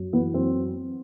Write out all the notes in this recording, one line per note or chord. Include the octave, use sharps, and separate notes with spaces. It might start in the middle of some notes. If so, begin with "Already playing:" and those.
Already playing: F#2
E3 B3
F#2 C4